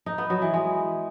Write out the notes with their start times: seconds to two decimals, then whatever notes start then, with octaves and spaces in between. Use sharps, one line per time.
0.06 D#4
0.18 B3
0.30 F#3
0.42 E3
0.54 G#3